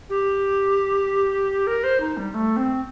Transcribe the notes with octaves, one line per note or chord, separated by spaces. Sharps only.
G4
A#4
C5
D#4
G3
A3
C4